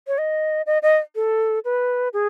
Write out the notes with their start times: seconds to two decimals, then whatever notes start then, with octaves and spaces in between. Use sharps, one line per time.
0.08 C#5
0.18 D#5
0.66 D#5
0.83 D#5
1.15 A4
1.65 B4
2.13 G#4